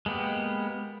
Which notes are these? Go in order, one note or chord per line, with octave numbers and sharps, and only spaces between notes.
G#3 A#3 B3 G4